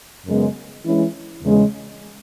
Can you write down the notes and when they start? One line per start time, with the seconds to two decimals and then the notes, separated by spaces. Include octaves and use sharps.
0.26 F#2 C#3 G#3 B3
0.84 E3 G#3 C#4 E4
1.42 E2 C#3 G#3